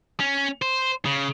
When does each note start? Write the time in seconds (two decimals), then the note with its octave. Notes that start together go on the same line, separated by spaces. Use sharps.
0.20 C#4
0.62 C5
1.05 C#3